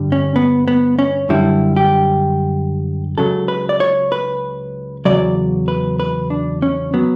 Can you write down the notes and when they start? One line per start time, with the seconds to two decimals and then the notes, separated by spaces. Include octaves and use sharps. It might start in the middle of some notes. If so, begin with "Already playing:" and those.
Already playing: G2 D3 G3
0.12 C#4
0.36 B3
0.68 B3
0.99 C#4
1.29 F#2 D3 G3 E4
1.76 G4
3.18 C#2 C#3 F#3 A4
3.48 B4
3.69 D5
3.80 C#5
4.12 B4
5.05 E2 C#3 F#3 D5
5.68 B4
6.00 B4
6.30 D4
6.62 C#4
6.94 F#3 B3